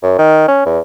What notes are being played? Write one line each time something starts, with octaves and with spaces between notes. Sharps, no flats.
F#2
D#3
C#4
E2